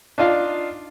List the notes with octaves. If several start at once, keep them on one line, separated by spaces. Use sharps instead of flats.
D4 D#4 F4 F5